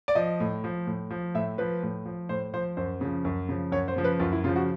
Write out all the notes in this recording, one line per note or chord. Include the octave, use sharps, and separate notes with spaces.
D5
F3 D#5
A2
F3
A2
F3
A2 E5
F3 B4
A2
F3
A2 C5
F3 C5
F#2 C5
C#3 F3
F#2
C#3 F3
F#2 C#5
C5
C#3 F3
B4
F#2 F4
E4
C#3 F3 F4
F#4